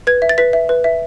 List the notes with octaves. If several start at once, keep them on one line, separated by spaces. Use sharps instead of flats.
B4 G#6
E5
A6
B4 B6
E5
B4
E5